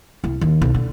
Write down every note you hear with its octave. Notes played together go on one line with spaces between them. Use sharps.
C2
D#2
B1
D3